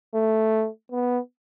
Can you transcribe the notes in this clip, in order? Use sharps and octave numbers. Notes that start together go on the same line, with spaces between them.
A3
B3